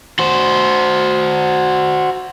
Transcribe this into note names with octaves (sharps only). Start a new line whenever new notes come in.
F#4 C5